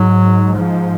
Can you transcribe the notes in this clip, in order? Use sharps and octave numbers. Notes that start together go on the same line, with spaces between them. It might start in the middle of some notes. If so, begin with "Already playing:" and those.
Already playing: G#2 F#3
F3